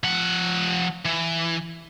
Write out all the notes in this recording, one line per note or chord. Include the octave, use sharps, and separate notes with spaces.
F3 F#5
E3